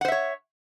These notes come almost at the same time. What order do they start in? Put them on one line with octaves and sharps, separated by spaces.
F#5 C5 E5 C#5